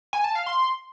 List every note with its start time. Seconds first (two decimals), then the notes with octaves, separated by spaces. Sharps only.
0.13 G#5
0.24 A5
0.35 F5
0.46 C6